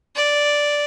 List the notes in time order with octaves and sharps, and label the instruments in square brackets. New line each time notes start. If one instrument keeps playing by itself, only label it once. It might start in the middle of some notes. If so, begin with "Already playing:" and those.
[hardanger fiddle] D5